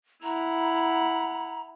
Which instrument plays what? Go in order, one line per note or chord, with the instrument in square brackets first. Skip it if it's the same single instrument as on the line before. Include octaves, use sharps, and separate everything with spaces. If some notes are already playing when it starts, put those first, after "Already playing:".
[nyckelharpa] E4 F#5 [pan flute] A#5